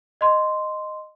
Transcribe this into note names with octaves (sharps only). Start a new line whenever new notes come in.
D#5 C6